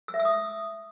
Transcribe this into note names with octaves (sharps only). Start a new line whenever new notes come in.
E6
E5
E6
D#6